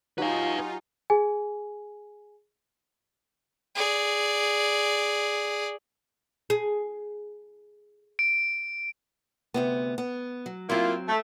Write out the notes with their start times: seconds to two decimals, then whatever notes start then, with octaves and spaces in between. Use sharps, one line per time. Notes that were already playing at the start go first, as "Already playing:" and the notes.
0.18 F#3 D#4 F4 G4 B4 F5 G#5
1.10 G#4 G#5
3.75 G#4 D5
6.50 G#4
8.19 D7
9.54 D2 C3 B3
9.98 B3
10.46 F#3
10.70 F#3 A#3 C4 E4 F4
11.08 A3